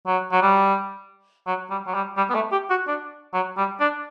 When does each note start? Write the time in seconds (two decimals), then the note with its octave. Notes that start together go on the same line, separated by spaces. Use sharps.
0.07 F#3
0.32 F#3
0.42 G3
1.47 F#3
1.70 G3
1.87 F#3
1.94 G3
2.17 G3
2.30 B3
2.35 A3
2.52 G4
2.70 F#4
2.87 D4
3.34 F#3
3.57 G3
3.80 D4